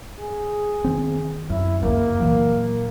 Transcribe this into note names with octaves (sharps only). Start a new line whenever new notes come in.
G#4
D#3 C4
F#2 E4
G1 C#2 F#2 A#3
A#2 E3 F#3